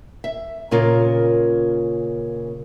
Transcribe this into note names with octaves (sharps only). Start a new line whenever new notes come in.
E5
A#2 C#3 F4 A#4